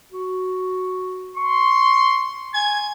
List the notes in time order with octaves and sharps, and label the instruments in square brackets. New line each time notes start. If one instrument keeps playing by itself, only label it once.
[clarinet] F#4
[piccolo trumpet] C6 [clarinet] C#6
[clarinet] G#5 [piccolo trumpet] G#6